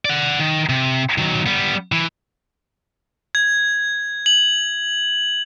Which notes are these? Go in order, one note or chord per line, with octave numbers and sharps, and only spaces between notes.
D5 F#5
D#3
C3
D#3 F#3
G3 B3
E3
G#6
F#7